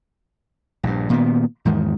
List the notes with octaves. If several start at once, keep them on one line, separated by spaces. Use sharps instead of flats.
A#1 G2
A#2 D#3 B3
E2 G#2 D#3